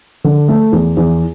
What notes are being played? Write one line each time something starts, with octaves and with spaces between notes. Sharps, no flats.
D3
A3
E2
E2